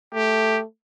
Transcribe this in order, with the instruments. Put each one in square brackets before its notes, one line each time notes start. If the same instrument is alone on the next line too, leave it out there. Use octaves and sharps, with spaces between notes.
[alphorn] A3 [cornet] G4